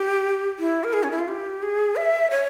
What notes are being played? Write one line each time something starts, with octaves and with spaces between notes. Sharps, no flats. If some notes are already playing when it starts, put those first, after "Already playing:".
Already playing: G4
E4
A#4
G#4
C#4
E4
F4
G4
G#4
E5
C#5